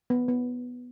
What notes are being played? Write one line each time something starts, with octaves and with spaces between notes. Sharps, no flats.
B3
B3